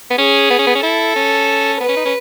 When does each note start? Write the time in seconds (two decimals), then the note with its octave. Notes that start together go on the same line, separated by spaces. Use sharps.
0.10 B3
0.18 C#4 G#4
0.50 B3
0.58 C#4
0.67 B3
0.75 C#4
0.83 E4 A4
1.16 C#4
1.80 B3 B4
1.88 C#4
1.96 D#4
2.05 C#4